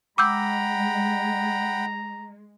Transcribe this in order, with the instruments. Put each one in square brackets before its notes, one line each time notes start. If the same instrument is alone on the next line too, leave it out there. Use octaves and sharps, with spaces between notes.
[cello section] G#3 [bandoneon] F#5 G5 B5 [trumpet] A#5 [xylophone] D6 E6 G6